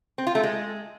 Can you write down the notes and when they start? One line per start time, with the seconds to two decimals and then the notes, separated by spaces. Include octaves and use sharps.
0.18 C4
0.27 F4
0.35 A3
0.43 G#3